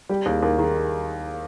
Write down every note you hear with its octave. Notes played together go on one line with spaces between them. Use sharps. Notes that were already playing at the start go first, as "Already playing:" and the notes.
G3 G4
D#2 G#4
D#2 A#4
D#3 G#4